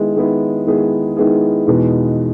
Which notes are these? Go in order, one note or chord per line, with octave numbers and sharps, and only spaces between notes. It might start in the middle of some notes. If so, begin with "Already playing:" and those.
Already playing: D#3 G#3 B3 E4 G#4
D#3 G#3 B3 E4 G#4
D#3 G#3 B3 E4 G#4
D#3 G#3 B3 E4 G#4
E2 B2 G#3 B3 D#4